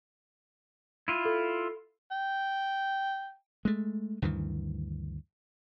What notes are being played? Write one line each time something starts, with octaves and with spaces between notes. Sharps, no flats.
E4 F4 D#7
A4
G5
G#3 A3
D2 G2 D#3 E3